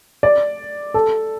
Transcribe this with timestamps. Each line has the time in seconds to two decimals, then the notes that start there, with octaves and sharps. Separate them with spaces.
0.23 D5
0.94 A4